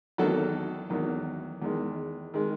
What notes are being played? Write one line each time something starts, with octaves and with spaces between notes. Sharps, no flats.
E2 D#3 F#3 A4
E2 D#3 F#3
E2 D#3 G#3
D#3 G#3